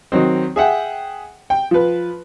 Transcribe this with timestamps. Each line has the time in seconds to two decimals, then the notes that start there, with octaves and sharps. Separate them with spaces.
0.12 D#3 F#3 C4
0.56 G#4 E5 F#5 G5
1.50 G5
1.71 F3 B4